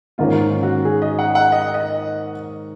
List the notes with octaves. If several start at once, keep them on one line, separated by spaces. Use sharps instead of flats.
G#2 D#3 A#3 C#4 F4
F#4
G#4
D#5
F#5
F#5
D#5
D#5